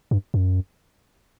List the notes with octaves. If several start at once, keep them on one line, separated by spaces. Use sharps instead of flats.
G2
F#2